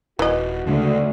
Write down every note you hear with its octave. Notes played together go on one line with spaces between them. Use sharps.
D#1 E3 F#4 D#5
D2 C#3 G#3